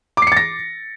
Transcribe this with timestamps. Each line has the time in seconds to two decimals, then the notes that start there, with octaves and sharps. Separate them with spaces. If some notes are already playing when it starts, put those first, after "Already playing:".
0.17 D6
0.22 C7
0.27 C#7
0.32 A6
0.37 A#6